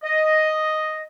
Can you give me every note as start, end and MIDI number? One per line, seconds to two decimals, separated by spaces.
0.04 1.03 75